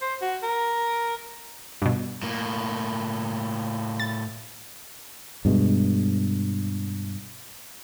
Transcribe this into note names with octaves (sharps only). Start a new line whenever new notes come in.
C5
F#4
A#4
G2 B2
A2 A#3
A6
G2 B2 G#3